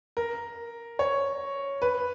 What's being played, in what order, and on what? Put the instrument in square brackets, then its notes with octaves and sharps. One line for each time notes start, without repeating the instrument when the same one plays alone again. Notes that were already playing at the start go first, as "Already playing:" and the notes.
[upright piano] A#4
C#5
B4